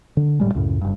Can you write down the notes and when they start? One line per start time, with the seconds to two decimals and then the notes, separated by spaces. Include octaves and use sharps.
0.17 D3
0.40 F1 A2 G3 G#3
0.54 C#2 F#2 A2 C#3
0.82 F#1 G2